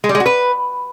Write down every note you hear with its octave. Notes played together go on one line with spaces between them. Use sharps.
G#3
G3
G#3
F#4
B4